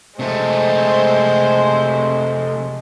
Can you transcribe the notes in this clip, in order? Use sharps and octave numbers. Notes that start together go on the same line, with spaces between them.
C3 G#3 A3 C5